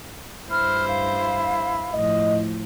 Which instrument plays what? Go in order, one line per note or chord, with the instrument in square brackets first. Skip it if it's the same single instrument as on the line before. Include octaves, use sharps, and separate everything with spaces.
[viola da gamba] G2 C5 [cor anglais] E4 [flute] F6
[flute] F5
[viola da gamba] A2 F3 [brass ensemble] D#5